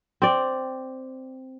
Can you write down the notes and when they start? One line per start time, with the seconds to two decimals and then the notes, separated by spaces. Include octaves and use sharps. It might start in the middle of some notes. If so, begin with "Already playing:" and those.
0.22 C4 D5